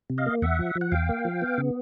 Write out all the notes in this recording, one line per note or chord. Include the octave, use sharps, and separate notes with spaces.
C3
D#5 F5
A#3
E2 E5 F#5
F3
F3
F#5
E2 F5 G5
A#3
F3
B3
C#3